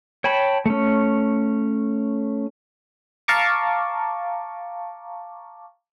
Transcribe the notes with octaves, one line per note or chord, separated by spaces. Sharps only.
C#5 G5 A5 B5
A3 C#4
F5 A5 A#5 C#6 D6